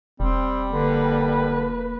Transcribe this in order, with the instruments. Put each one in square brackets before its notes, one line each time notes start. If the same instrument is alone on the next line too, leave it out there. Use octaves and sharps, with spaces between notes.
[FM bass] E1 [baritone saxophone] G3 [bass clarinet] C4
[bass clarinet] D3 [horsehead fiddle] A#3 B4